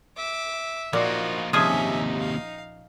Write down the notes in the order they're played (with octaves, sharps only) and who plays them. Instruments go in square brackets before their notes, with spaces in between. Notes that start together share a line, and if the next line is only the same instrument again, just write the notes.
[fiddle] E5 [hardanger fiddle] D6
[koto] A#2 [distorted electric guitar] F3 A#3 [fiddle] D#4 F4 [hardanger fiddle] F#4
[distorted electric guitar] D#2 C3 [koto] F3 G#4 [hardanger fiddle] C#4 E5 [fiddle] D#4
[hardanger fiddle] F5